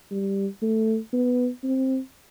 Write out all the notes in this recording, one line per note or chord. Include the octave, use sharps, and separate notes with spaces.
G3
A3
B3
C4